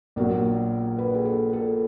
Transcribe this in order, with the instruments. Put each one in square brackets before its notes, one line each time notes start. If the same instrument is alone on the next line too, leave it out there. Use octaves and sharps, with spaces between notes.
[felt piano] A#1 A#2 F#3 A#4
B4
G#4
A4
A4